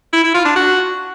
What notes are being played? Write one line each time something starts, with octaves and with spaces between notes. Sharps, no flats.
E4
E4
F4
D4
F#4